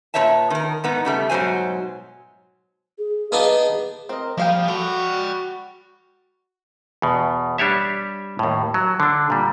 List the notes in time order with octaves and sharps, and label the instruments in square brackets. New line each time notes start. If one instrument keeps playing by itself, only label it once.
[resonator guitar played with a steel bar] A#2 A3 B4 C#5 E5 A5
D#3 A#4
G#2 B3 D#4
C#3 G3 A3
G#2 B2 F#3 C5 G#5
[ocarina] G#4
[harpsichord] B3 D4 D#4 [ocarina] F5
[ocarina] G#4
[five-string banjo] C4 D#5 [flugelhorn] A#4
[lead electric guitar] F3 [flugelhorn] G3 [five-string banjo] A#3 F5 G5
[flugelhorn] F#4 [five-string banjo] A4 [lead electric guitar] G5 B5
[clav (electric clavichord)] E2 B2
G3 D4 G4 C#5 E5
D#2 A2
F#3
D3 D4
A#2 G3